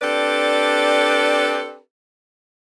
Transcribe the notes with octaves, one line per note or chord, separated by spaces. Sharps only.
C4 D4 G4 A4 B4 D5